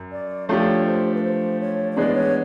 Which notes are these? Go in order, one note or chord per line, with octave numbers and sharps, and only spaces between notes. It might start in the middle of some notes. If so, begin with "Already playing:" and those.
Already playing: F#2
D5
F3 A3 D4 G4 C#5
C5
B4
C5
C#5
C#5
E3 G#3 B3 D4 D5
C#5